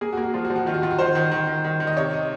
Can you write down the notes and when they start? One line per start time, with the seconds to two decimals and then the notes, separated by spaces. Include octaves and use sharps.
0.01 A#3 G#4
0.13 F#4
0.17 A#3
0.23 F#4
0.34 F3 F4
0.45 F#4
0.50 F3
0.56 F#4
0.66 D#3 F4
0.74 F#4
0.82 D#3 F4
0.91 F#4
0.99 D#3 C5
1.15 D#3
1.32 D#3
1.47 D#3
1.65 D#3
1.80 D#3
1.87 D#5
1.97 C3 C#5
2.13 D#4